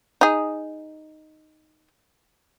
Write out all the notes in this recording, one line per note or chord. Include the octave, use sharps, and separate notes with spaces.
D#4 G#4